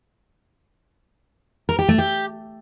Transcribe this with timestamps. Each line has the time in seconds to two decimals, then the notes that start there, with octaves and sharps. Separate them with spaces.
1.69 A#4
1.79 G4
1.89 A3
1.98 G4